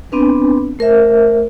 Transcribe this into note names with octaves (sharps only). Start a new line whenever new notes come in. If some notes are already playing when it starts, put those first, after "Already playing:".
B3 C4 D4 B4
A3 A#4 C5 E5